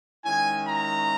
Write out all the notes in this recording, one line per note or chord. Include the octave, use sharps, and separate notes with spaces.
D#3 G#3 C#4 E4 G#5
A#5